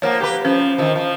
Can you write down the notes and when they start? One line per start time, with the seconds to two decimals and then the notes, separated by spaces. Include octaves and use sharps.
0.02 F3 A#3 C#5 F#5
0.20 G4 B4
0.45 F3 C#4 C5
0.78 D#3 F3
0.96 F3